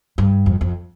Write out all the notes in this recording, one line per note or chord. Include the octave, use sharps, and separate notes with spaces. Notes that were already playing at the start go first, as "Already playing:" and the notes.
G2
F2
F2